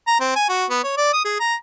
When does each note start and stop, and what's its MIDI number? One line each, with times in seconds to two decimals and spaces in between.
0.07 0.15 82
0.20 0.31 60
0.36 0.44 80
0.49 0.65 66
0.70 0.80 59
0.83 0.95 73
0.97 1.11 74
1.13 1.21 87
1.25 1.37 68
1.40 1.55 82